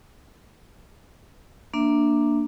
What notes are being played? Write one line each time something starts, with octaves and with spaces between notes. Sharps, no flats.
A#3 D4 E5